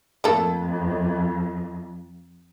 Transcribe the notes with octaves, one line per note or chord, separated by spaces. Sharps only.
F2 A3 A#3 A4